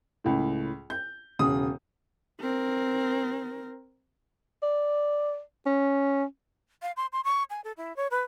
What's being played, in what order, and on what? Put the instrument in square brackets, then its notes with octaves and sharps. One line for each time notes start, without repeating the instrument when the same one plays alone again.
[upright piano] C#2 A2
G6
E1 C#3 D#6
[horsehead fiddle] C4 A#4
[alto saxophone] D5
C#4
[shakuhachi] F5
C6
C6
C#6
G#5
A4
E4
C#5
B4